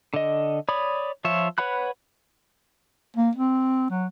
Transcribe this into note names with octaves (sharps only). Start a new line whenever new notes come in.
D3 D#5
C#5 D5 B5 D#6
F3 F4 C#5 E5
B4 C#5 F#5 B5 F#6
A#3
C4
F#3